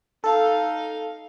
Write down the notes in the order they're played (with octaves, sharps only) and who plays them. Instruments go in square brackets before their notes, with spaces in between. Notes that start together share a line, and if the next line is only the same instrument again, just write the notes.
[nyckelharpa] D#4 F5 [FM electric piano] A4